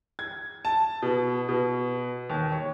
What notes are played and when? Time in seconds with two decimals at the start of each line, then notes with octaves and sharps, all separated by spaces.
0.19 G#6
0.65 A5
1.02 B2
1.49 B2
2.30 D#2
2.52 C#5